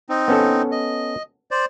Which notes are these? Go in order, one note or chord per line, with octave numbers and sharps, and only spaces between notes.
C4 D#4
B3 C#4 A4
D#5
C5 D5